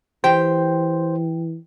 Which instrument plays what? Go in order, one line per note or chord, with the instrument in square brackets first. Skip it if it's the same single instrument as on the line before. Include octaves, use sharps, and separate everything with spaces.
[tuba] E3 [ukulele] G4 [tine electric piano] C5 [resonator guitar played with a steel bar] G5